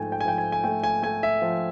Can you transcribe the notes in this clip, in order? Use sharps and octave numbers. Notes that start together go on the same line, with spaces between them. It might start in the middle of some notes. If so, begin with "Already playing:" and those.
Already playing: G#2 F3 A3 G5 G#5
G5
G#5
F3 G5
G#5
G#5
A3 G5
G#5
A3 G#5
E5
F3